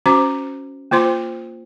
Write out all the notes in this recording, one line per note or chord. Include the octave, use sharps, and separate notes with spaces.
C#4 F#4 C5 D6
A#3 F4 C5 C6